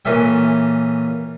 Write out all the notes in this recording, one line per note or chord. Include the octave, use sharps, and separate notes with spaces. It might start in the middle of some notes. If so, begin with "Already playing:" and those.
A#2 E3 C#4 A4 E5 G5